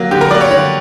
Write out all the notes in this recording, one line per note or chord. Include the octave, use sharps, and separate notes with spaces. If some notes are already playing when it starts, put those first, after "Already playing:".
Already playing: F#3 A#3
D3 G4
A#4
F#3 A#3 D5
C#5
D3 C#5